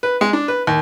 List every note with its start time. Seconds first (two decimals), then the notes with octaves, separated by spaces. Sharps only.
0.03 B4
0.21 G#3
0.33 D4
0.48 B4
0.67 D#2